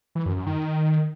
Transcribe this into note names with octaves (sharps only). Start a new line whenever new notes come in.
E3
F#2
F#2
D#3